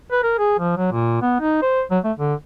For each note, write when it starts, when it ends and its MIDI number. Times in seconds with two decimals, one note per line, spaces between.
0.11 0.21 71
0.23 0.34 70
0.38 0.55 68
0.59 0.76 53
0.77 0.91 54
0.92 1.20 46
1.22 1.36 59
1.40 1.60 63
1.62 1.82 72
1.91 1.99 54
2.04 2.12 57
2.17 2.35 50